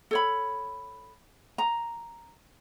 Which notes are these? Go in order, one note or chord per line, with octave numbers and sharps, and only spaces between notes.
A4 C#5 B5
A#5